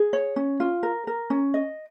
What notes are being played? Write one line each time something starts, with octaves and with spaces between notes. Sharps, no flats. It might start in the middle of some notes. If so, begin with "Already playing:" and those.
Already playing: G#4
C#5
C#4
F4
A#4
A#4
C#4
D#5